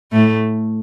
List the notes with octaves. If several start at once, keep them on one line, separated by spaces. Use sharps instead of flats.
A2 A3